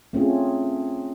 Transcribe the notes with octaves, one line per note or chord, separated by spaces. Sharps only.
A3 C4 C#4 F4 G#4